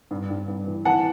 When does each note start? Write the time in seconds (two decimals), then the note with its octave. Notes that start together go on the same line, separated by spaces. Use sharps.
0.11 G2
0.30 G2
0.48 G2
0.67 E3
0.85 E3 F#5 A5